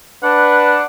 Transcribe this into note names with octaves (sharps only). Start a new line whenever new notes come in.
D4 B4 F#5